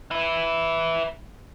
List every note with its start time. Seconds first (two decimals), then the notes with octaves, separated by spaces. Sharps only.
0.11 B4 E5